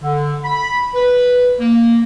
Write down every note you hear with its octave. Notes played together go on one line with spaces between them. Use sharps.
D3
B5
B4
A#3